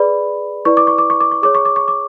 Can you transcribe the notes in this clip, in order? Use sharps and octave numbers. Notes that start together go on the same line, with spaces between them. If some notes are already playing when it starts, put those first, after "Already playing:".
Already playing: G#4 B4 D5 B5
E4 B4 D5 C#6
D6
C#6
D6
C#6
D6
C#6
G#4 C#5 D6
C#6
D6
C#6
D6